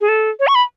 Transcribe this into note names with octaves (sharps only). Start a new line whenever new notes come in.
G#4
A4
C#5
C#6
B5